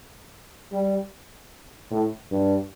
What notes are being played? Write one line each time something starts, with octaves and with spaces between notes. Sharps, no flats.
G3
A2
G2